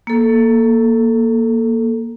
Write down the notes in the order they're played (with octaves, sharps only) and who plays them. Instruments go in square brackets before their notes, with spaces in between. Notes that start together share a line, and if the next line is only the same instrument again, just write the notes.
[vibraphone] A#3 A4